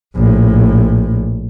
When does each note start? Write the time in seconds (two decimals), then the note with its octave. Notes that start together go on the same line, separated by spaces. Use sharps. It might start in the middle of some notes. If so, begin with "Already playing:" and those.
0.16 A#1 A2